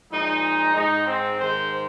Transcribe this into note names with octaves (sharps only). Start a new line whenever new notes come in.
A#2 F3 G#3 D#4
G#2 G#3 D#4
C4
G#2 D#3 G#3 C5